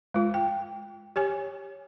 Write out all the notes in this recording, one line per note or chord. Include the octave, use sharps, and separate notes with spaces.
G#3 F4
G5
G4 C#5 G#5